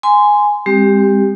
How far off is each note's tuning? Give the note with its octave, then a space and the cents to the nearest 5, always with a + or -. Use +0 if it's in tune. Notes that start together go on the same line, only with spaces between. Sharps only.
G#5 +0 C6 -20
G#3 -45 C4 +10 G4 +0